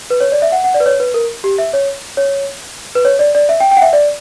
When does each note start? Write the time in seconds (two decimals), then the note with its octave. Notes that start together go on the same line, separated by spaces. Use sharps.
0.10 B4
0.20 C#5
0.32 D5
0.42 E5
0.52 F#5
0.64 F#5
0.74 D5
0.80 B4
0.86 C#5
1.00 B4
1.14 A#4
1.44 G4
1.58 E5
1.73 C#5
2.17 C#5
2.95 B4
3.05 C#5
3.19 D5
3.35 D5
3.49 E5
3.60 G5
3.71 G5
3.77 F#5
3.82 E5
3.93 D5